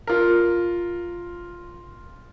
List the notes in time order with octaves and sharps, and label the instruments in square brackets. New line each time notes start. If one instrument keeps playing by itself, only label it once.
[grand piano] F4 A#4